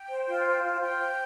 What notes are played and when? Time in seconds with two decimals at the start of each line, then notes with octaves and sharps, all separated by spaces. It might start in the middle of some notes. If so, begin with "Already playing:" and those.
Already playing: G5
0.09 C5
0.27 F4
0.45 C5
0.63 F4
0.80 F4 G5
0.98 C5